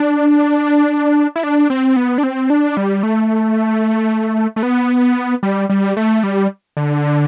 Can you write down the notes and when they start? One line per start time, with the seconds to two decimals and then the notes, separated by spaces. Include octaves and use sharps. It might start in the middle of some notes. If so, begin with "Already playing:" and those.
Already playing: D4
1.36 E4
1.43 D4
1.70 C4
1.96 B3
2.18 D4
2.23 C4
2.50 D4
2.77 G3
3.03 A3
4.56 A3
4.63 B3
5.43 G3
5.69 G3
5.97 A3
6.23 G3
6.77 D3